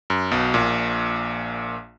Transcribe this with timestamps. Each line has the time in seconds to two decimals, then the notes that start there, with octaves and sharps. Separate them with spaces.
0.10 F#2
0.31 B1 B2
0.54 A#1 A#2